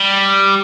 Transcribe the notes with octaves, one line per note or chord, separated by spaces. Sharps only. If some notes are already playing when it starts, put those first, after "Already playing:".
Already playing: G3